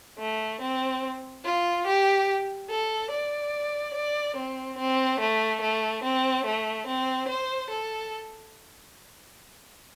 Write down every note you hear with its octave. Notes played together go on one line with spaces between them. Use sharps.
A3
C4
F4
G4
A4
D5
D5
C4
C4
A3
A3
C4
A3
C4
C5
A4